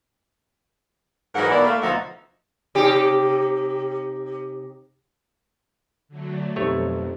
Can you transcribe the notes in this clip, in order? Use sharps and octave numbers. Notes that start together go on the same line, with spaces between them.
G#2 E3 F#3 D#4 A#4 F#5
B2 D#3 A#3 E4 D5
A3 A#3
D2 B2 F3 D#4 E5 F#5
C3 D#4 G4
D3 F#3 A3
B1 F2 A3 C4 D#4 G4 C#5